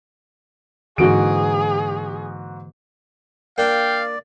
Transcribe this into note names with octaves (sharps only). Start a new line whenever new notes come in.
G#2 D3 E3 A#3 F#4 G#4 D7
A#3 D4 D5 F5 G5